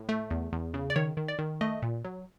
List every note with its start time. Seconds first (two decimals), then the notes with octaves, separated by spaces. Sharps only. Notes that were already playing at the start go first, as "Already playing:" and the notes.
Already playing: A2
0.09 A3
0.31 E2
0.53 E2
0.74 C#3
0.90 D5
0.96 D#3 C#5
1.17 D#3
1.28 D5
1.39 D#3
1.61 A3 D#5
1.82 A#2
2.05 F#3